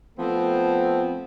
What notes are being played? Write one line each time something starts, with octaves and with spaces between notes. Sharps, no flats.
F3 A3 B3 C4